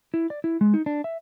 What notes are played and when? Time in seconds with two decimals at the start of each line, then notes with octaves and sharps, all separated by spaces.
0.14 E4
0.30 D5
0.44 E4
0.61 G#3
0.74 D#4
0.86 D4
1.04 E5